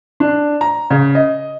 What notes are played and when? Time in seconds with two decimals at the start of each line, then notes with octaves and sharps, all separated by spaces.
0.20 D4
0.61 A#5
0.90 C#3
1.15 D#5